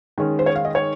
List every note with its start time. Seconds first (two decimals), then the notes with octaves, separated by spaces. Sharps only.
0.18 D#3 G#3 C#4
0.39 C5
0.46 C#5
0.55 F5
0.65 D#5
0.75 C#5